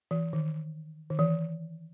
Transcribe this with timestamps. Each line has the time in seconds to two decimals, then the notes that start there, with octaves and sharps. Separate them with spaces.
0.11 E3
0.33 D#3
1.10 D#3
1.19 E3